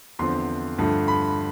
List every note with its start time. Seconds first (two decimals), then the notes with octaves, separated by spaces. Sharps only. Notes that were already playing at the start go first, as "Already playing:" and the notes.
0.19 E2 D3 F3 C4 C6
0.78 G2 D3 F3 A3
1.08 B5